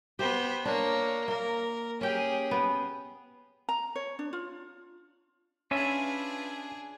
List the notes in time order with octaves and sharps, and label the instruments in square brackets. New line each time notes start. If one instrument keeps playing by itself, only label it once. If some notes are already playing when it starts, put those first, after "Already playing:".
[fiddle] B3 C5 [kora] G4
[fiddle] A#3 C#5 [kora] D4
[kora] A#3 [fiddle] A#4
[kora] C#4 G5 [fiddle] G4 G#4
[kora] B3
[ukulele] A#5
C#5
D4
F4
[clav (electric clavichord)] C#4 [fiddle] D4 G#4 [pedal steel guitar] F4 B4 E5